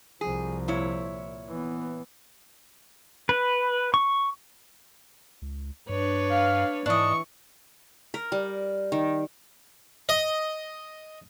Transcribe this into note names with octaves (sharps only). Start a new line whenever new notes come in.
C2 F3 G#4
A#2 E4 C#5
E3 B3
B4
C#6
C#2
G2 D4 B4 C#5
F5
G#2 E3 D4 D#5 C#6
A#4
G3
D#3
D#5